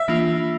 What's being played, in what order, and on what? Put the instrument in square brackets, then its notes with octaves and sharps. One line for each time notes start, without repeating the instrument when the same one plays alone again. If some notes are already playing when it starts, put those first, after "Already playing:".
Already playing: [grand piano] E5
[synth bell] E3 A#3 D4 F4